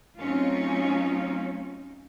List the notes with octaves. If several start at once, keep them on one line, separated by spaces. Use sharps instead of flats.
F#3 A3 C4 C#4 D#4 F4